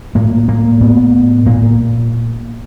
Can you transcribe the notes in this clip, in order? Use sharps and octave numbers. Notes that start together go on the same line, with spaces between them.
A2 A#3
A#3
A2 B3
A#2 A#3